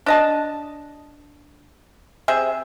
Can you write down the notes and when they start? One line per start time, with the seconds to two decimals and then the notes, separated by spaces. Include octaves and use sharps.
0.06 D4 D#5 A5
2.28 C3 G#4 E5